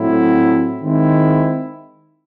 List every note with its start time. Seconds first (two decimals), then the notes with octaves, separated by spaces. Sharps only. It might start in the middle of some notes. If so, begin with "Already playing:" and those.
Already playing: A2 F#3 C4 E4
0.82 D#3 G#3 C4 E4